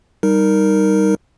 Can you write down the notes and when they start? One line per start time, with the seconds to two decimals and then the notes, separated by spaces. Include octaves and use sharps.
0.23 G3 D#4 A#4